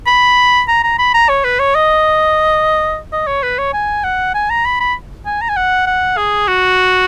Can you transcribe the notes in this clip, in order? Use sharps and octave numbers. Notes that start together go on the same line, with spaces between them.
B5
A#5
A#5
B5
A#5
C#5
B4
C#5
D#5
D#5
C#5
B4
C#5
G#5
F#5
G#5
A#5
B5
B5
G#5
A#5
G#5
F#5
F#5
G#4
F#4